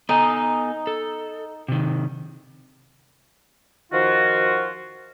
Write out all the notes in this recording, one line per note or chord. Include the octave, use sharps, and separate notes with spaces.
B3 D#4 A4 G#5
A4
C3 D#3
D#3 F3 F4 F#4